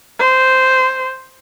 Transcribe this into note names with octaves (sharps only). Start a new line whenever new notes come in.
C5